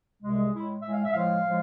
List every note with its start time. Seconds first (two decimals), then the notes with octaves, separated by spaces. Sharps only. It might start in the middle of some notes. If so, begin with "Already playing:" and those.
0.22 C2 C3 G#3
0.38 G#4
0.53 A2 G#3 E4
0.82 A2 G#3 E5
0.93 F5
1.04 E5
1.13 A2 F3 G#3 F5
1.44 A2 F3 G#3